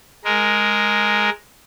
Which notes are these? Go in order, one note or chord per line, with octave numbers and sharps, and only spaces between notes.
G#3 A#4